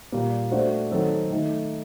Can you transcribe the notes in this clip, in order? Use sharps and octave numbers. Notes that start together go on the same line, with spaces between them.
A#2 G3 A#3
A3 D4 F#4 C5
D#3 F#3 C4 D#4 A4
D#3 A3 D#4